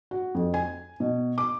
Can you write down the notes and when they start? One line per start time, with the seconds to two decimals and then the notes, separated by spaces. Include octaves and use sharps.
0.11 F#4
0.35 F2
0.54 G#5
1.00 B2
1.38 D6